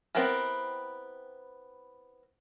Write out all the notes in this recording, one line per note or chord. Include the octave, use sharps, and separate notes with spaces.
B3 C4 E4 G4 A#4